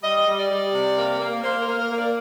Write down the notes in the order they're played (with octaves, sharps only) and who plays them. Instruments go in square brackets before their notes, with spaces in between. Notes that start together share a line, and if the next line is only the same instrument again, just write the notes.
[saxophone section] G3 D#5
G3
D5
G3
C3
A#3
A#3
A#3 C5
A#4
A#3
A#4
A#3
D5